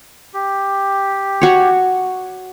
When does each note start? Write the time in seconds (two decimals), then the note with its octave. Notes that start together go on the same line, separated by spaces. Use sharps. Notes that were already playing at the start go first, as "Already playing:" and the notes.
0.34 G4
1.42 F#4 C#5